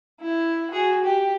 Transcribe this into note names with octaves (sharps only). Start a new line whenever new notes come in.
E4
F#4 G#4
G4